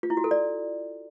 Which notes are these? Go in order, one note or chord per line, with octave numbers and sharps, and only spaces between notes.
F4
E4
F#4
A4
D5